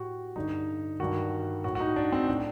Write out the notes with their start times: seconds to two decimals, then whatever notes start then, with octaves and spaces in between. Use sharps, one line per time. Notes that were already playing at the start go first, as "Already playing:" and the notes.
Already playing: A2 F#4 G4
0.36 G2 D3 D#4
1.00 G2 D#3 F#4
1.64 A2 F#4
1.75 F#4
1.80 D#4
1.96 D4
2.12 C4
2.28 A2 D4